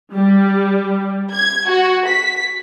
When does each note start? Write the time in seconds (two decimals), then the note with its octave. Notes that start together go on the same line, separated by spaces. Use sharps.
0.13 G3
1.33 G#6
1.67 F#4
2.08 B6